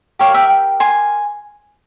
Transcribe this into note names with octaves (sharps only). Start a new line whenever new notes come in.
G4 A#4 C#5 F5
E5 G5
G#5 C6